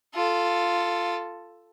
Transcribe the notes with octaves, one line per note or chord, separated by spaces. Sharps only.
F4 A4